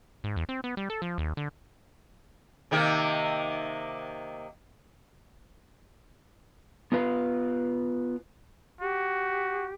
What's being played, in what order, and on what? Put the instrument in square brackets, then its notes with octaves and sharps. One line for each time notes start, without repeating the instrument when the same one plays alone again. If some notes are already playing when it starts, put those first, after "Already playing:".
[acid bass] G#2
E2
C4
B3
G3
A4
F3
D#2
D3
[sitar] C3 D#3 A#3
[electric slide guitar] B3 F4 B4 F5
[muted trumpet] F#4 [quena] G4